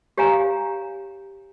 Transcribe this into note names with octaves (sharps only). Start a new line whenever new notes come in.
G4 C#5 F5 G#5 A#5